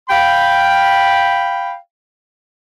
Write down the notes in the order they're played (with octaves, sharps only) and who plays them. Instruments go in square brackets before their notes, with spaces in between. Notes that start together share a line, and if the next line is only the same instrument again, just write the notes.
[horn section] F5 G5 B5